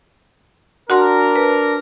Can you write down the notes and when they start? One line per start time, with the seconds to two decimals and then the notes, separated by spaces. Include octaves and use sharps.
0.90 D4 F#4 A#4 F#5 C6
1.36 B4